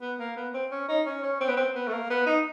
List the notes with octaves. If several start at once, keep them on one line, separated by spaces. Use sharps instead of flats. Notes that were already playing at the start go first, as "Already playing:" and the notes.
B3
A#3
B3
C4
C#4
D#4
C#4
C#4
C4
B3
C4
B3
A3
A#3
B3
D#4